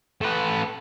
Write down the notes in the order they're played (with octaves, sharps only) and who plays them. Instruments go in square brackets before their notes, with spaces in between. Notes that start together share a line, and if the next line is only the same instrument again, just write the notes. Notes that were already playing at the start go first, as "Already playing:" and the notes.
[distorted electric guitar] A3 B4